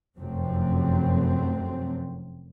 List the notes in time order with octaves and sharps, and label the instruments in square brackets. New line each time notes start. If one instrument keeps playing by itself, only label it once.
[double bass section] F1 F#2 C3 F#3 A3 C4